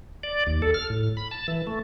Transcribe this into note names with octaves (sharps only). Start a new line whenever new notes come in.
D5
D#2
A4
F6
A2
B5
A5
E3
A3